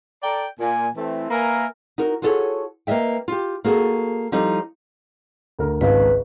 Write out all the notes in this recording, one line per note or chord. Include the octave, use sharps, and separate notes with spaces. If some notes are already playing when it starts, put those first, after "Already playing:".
A4 D5 G5 A#5
A#2 G#5
E3 A3 C4
A#3 A#4 B4 E5 G#5 A#5
D#4 F#4 A#4
F4 F#4 G#4 A4 C5 C#5
A#3 B4 D#5 E5 G5
F4 G4
A#3 F#4 G#4 A4
F3 G3 D#4 A4 D#5
D2 A#4
G#1 C#2 B4 F5